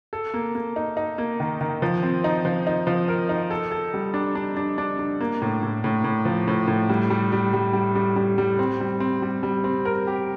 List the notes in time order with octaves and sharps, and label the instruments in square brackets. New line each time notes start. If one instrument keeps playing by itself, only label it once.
[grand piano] A4
A#3
A#3
D#4
D#4
A#3
D#3
D#3
F3
C4
D#4
F3
D#4
F3
A#4
D#4
A4
A4
G3
D4
D4
D4
D4
D4
A#3
A2
A2
A2
A2
F3
A2
A2
G3
G3
G3
G3
G3
G3
G3
G3
C4
G3
C4
G3
G3
C4
A#4
G4